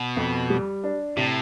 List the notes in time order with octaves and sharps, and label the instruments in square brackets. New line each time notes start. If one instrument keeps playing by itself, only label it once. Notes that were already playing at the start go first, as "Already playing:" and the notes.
Already playing: [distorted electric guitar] B2
[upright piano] F2
G3
D4
[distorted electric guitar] A2 [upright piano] C3